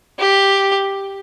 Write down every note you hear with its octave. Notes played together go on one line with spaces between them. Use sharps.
G4